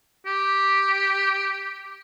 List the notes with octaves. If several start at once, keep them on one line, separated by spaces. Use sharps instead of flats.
G4